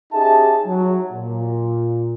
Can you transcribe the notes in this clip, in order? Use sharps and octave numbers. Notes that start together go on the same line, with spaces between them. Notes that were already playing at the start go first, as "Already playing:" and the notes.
C#4 D#4 G4 G#4 E5 A5
F#3
A#2